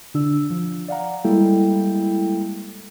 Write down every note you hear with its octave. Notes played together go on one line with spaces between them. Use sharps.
D3 D4 E6
F3
D5 F5 F#5 A#5
G3 G#3 A#3 E4 A4 G5